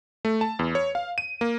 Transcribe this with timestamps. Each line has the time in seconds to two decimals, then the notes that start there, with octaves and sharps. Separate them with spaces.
0.25 A3
0.41 A5
0.59 E2
0.75 C#5
0.95 F5
1.18 D#7
1.41 A#3